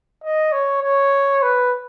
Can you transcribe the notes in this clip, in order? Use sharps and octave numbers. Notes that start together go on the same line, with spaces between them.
D#5
C#5
C#5
B4